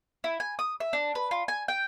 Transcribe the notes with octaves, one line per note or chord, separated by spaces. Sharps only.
E4
G#5
D#6
E5
D4
B4
F4
G#5
G5